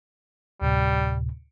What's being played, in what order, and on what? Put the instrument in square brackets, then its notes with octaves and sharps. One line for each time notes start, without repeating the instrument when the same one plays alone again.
[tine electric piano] D2 A2 C3 [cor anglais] G3